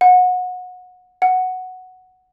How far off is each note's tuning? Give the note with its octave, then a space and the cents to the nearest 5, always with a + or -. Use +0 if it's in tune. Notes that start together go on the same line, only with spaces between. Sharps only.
F#5 -25
F#5 +0